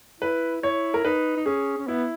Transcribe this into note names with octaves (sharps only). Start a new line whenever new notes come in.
E4 B4
E4 C#5
A#4
D#4 B4
D#4
C#4 G#4
C#4
B3 E4